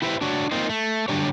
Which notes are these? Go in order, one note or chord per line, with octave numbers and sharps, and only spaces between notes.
E4 G4 B4 C5 E5
D4 F#4 C#5
A#3 C4 D#4 F4
A3
D3 F#3 G3 D4 G4 C#5